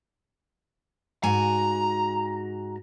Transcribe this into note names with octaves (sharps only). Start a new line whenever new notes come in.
G#2 F#4 G#5 A#5